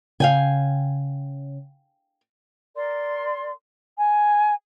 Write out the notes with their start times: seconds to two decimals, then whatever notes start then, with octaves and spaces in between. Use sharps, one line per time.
0.20 C#3 F5 G5 G#5
2.75 A#4 D5 C6
3.98 G#5